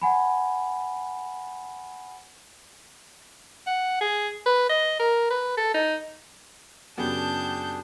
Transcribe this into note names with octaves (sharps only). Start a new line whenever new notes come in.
F#5 G#5 B5
F#5
G#4
B4
D#5
A#4
B4
A4
D#4
F#2 C#3 B3 D4 G4 G#4 A5 G6